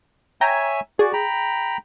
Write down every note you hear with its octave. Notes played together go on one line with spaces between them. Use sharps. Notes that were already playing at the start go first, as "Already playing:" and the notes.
C#5 E5 G5 G#5 A#5
F#4 G#4 D5
G5 A#5 B5